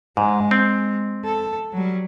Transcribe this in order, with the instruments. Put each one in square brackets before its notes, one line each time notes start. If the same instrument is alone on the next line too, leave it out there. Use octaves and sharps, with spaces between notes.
[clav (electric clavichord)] G#2 [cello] G#3
[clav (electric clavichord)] C4
[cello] A4
F#3 G3